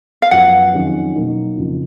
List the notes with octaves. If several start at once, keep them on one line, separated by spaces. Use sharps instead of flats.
F5
F#2 F3 B3 F#5
F2 D#3 F#3 C#4 G#4
B2 F#3 A#3 D#4
F2 C#3 F3